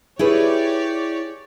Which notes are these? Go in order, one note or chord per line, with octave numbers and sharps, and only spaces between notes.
E4 G4 G#4 B4 C#5 D5